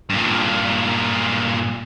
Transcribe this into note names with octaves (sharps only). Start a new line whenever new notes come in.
G2 A#2